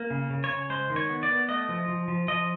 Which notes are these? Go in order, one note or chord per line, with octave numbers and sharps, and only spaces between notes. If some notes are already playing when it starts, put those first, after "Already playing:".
Already playing: A#3
C#3
C#3
C#5
C#3
G#3 C5
D#3
C#5
B3
D5
B3
A3 D#5
F3
F3
F3
F3 D#5